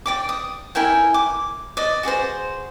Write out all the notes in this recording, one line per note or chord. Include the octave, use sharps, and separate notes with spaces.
D5 G5 D6
D#6
E4 A#4 G5 G#5
D6
D5 D#5
F#4 G#4 B4 C5